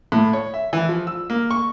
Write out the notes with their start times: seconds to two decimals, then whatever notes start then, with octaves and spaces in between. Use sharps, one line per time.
0.12 A2
0.33 C#5
0.54 E5
0.73 E3
0.89 F3
1.07 E6
1.30 A#3
1.51 C#6